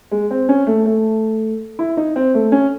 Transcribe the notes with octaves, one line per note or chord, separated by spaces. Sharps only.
G#3
C4
C#4
A3
A3
E4
D#4
C4
A3
C#4